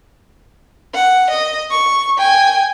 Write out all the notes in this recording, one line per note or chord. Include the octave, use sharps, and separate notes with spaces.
F#5
D#5
C#6
G5 G#5